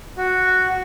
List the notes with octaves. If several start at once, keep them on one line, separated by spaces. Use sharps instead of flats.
F#4